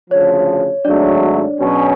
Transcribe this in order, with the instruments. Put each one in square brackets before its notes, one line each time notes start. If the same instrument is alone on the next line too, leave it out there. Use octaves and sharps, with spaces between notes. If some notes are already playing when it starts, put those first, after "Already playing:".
[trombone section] D2 C#3 F3 [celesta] C#5
[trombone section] G#1 G#2 F#3 A3 [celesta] D4 D5
[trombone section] B2 F#3 C#4 G#4